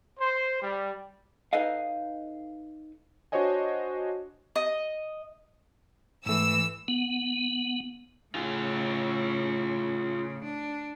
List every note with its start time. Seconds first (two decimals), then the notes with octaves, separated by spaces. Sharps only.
0.19 C5
0.62 G3
1.53 D#4 A4 B4 D#5 F5
3.32 D4 F#4 C5 C#5 D#5 G#5
4.56 D#5
6.26 G#2 E3 A3 E6
6.88 B3
8.35 A2 C#3 F4 G#4
10.44 D4